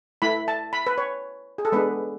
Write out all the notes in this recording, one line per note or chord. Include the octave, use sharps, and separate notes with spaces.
A3 E4 B5
A5
B5
B4
C#5
G#4
A4
G#3 B3 D4 B4